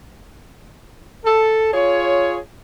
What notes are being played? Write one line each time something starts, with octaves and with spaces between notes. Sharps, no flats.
A4
F4 G#4 C#5